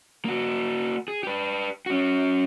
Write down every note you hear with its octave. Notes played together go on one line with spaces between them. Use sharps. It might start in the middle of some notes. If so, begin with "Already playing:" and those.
A#3 F#4
G#4
G4 B4
C#4 F#4